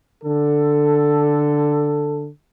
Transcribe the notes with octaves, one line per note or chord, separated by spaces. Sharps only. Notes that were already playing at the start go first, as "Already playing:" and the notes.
D3 A4